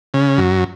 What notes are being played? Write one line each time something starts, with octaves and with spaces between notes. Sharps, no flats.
C#3
F#2